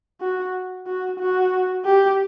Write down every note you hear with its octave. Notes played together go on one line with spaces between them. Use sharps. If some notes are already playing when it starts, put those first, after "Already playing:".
F#4
F#4
F#4
G4